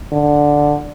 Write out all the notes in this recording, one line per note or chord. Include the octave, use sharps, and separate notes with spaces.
D3